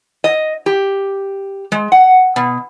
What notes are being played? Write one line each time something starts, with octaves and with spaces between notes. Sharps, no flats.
D#5
G4
G#3
F#5
B2